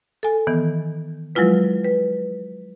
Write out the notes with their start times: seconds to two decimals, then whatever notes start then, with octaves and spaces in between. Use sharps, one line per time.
0.23 A4 G#5
0.47 D#3 E3 B3
1.35 F3 F#3 G#3 E4 F4 B4
1.84 B4